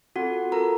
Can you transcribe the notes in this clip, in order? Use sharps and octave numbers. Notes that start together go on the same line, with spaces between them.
C4 F4 F#4 A4 F#5
C4 F4 A4 A#4 A#5